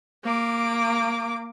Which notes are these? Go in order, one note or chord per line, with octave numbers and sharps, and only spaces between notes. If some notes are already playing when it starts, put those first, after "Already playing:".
A#3 D6